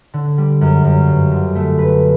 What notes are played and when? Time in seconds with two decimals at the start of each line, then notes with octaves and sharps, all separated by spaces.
0.14 D3
0.38 G3
0.61 F#2
0.85 F#2
1.08 G2
1.32 D3
1.55 A3
1.79 B4